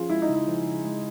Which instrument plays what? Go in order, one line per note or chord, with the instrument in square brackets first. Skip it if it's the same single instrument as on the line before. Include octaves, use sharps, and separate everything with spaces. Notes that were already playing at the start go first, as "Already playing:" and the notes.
Already playing: [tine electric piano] F3 C#4 [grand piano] F4 G#4
[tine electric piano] G#3 [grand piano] E4
[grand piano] D#4
[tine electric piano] C#3 [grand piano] E4
[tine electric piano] F3
C#3
G#3